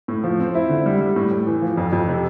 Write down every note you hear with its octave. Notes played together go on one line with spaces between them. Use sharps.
A2
F3
C4
E4
D3
G3
G3
A2
A2
E3
F3
F2
F2
C3